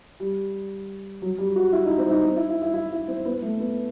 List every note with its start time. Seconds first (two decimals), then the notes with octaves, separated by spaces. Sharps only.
0.20 G3
1.22 F#3
1.38 G3
1.56 F#4
1.72 E4
1.85 D#4
1.98 C4
2.11 D#4
2.23 C4
2.36 E4
2.49 E4
2.62 E4
2.74 E4
2.91 E4
3.08 C4
3.25 B3
3.42 A3
3.60 B3